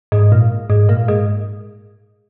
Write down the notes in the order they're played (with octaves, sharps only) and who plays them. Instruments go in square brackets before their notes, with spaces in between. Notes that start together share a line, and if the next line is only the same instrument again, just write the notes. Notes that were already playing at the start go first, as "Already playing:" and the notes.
[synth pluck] G#2
A#2
G#2
A#2
G#2